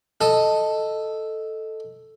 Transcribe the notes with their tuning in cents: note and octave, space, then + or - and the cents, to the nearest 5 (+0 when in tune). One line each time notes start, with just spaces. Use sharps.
A4 +0 D#5 +0